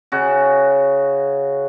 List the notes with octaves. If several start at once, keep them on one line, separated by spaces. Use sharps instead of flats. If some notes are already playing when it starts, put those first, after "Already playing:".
C#3 F#4